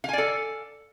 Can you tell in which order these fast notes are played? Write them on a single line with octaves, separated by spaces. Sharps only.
F5 G#5 D5 A4